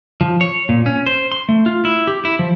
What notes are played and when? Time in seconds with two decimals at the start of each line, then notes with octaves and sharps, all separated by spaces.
0.21 F3
0.41 C#5
0.69 A#2
0.86 C#4
1.07 C5
1.32 C6
1.49 A3
1.66 F4
1.85 E4
2.07 G4
2.25 E4
2.39 F3